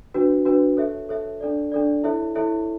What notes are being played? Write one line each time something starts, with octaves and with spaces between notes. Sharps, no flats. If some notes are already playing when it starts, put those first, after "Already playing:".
D4 F#4 B4
D4 F#4 B4
A4 C#5 E5
A4 C#5 E5
D4 A4 D5
D4 A4 D5
E4 A4 C#5 E5
E4 A4 C#5 E5